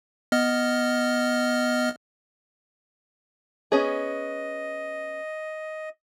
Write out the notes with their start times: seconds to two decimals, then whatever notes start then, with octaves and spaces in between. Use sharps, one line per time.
0.32 B3 D#5 F6
3.72 B3 C#4 G#4 D#5